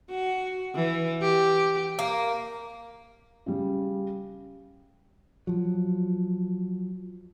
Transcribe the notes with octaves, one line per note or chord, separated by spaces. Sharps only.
F#4
E3
G4
A#3
C#3 G3
F3 F#3